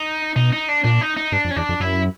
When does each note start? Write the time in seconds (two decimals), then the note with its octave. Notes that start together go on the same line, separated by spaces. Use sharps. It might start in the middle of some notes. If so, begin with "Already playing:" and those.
Already playing: D#4
0.36 B2 D#4
0.53 D#4
0.69 D4
0.84 A#2 D4
1.01 D#4
1.17 D#4
1.32 G2 D4
1.45 F2
1.51 C#4
1.56 E2 D4
1.69 F2
1.80 F#2 E4